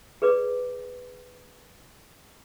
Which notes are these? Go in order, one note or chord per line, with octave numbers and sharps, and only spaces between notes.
G#4 B4 D5 D6